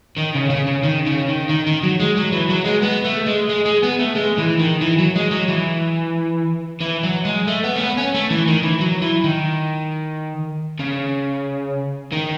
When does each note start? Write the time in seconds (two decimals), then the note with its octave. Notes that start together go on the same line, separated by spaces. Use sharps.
0.17 D#3
0.34 C#3
0.50 C#3
0.67 C#3
0.83 D#3
1.06 C#3
1.28 D#3
1.49 D#3
1.67 D#3
1.83 F#3
2.00 G#3
2.17 F#3
2.32 E3
2.50 F#3
2.66 G#3
2.83 B3
3.05 A3
3.26 G#3
3.49 G#3
3.66 G#3
3.83 B3
3.99 A3
4.15 G#3
4.38 E3
4.59 D#3
4.81 E3
4.99 F#3
5.16 G#3
5.31 F#3
5.48 E3
6.80 E3
7.03 F#3
7.25 G#3
7.47 A3
7.64 B3
7.76 A3
7.80 B3
7.97 C#4
8.14 A3
8.30 E3
8.48 D#3
8.63 E3
8.81 F#3
9.02 E3
9.24 D#3
10.79 C#3
12.12 D#3